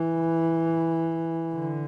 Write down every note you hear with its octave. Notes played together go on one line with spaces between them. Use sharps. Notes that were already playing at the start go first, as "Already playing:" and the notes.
Already playing: E3
D3